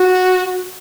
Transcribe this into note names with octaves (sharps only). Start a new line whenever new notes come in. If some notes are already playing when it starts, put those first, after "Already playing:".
Already playing: F#4